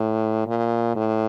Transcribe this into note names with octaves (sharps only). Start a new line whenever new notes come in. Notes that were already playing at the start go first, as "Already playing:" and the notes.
Already playing: A2
A#2
A2